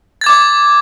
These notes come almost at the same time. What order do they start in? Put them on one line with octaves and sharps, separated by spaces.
A6 G#6 D6